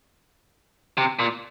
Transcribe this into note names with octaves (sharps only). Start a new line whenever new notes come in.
C3
A#2